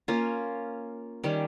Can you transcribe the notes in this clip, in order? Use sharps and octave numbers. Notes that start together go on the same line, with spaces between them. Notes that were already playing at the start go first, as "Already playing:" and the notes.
A#3 C#4 F4
D#3 G3 C#4